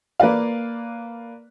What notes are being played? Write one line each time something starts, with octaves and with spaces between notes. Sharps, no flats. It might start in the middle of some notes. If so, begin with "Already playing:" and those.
A#3 B4 D5 F5